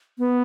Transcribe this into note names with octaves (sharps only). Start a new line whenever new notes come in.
B3